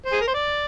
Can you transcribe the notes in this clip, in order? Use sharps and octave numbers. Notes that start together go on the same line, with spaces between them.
C5
G#4
A#4
C5
D5